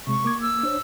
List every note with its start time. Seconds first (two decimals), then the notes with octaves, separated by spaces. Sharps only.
0.07 C3 G#3 C#6
0.24 A#3 D6 G#6
0.42 E6
0.63 D4 C5 C#5